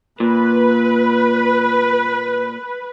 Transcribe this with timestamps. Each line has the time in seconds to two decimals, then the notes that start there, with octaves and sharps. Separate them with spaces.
0.20 A#2 B4